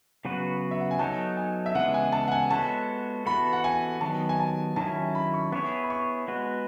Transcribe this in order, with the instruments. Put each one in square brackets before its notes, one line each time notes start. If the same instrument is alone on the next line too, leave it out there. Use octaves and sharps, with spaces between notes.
[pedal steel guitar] C#3 F#3 B3 F#4 B4
[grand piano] E5
F#5
G#5
[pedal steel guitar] F#3 B3 D#4 A4 C#5 [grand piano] A5
[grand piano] G#5
E5
[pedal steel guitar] C#3 E3 G#3 B3 [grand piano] F#5
[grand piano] G#5
A5
F#5
G#5
[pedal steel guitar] G#3 B3 F#4 A4 C#5 [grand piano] A5
[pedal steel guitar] E3 B3 F#4 A4 [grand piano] B5
[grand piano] F#5
G#5
[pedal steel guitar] D#3 F#3 B3 [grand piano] A5
[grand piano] G#5
A5
[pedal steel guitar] D#3 F#3 C#4 E4 [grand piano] A5
[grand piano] G#5
B5
C#6
[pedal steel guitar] B3 E4 G#4 C#5 [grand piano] C#6
[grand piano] B5
C#6
[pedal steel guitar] G#3 B3 F#4 B4